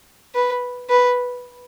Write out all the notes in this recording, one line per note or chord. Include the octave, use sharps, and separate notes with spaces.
B4
B4